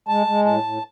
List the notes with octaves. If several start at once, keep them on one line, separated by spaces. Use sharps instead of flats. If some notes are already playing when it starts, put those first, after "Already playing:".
G#3 A5
G#3
A2 A5
A2